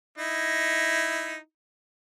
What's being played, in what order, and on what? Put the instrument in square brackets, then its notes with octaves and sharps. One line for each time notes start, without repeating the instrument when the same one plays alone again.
[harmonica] D#4 E4